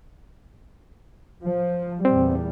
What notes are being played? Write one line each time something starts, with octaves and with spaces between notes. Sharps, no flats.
F3
E2 A#2 G3 C4